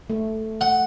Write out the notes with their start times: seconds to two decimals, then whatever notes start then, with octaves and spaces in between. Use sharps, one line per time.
0.10 A3
0.61 F#5